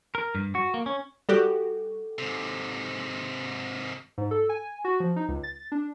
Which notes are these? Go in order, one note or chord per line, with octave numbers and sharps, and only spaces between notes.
A#4
G2
F#4
A#3
C#4
G3 F#4 G4 A4
G#2 C3
G#2
A4
G#5
F#4
F3
D#4
C#2
A6
D4